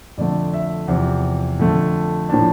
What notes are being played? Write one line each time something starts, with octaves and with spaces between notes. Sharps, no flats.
F2 D3 A3 D5
E5
E2 C3 F3
F2 D3 A3
A2 F3 A#3 D4 A5